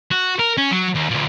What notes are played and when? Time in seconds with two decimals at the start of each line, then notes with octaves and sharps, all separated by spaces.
0.11 F#4
0.39 A#4
0.57 C#4
0.71 F#3
0.95 D#2
1.09 D2 A#2